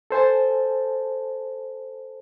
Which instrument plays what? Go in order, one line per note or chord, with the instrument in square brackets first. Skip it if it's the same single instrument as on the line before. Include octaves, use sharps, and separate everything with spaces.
[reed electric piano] A4 C5 G#5 A5